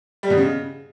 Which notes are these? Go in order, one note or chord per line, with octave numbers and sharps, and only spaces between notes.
G3
B2
C#3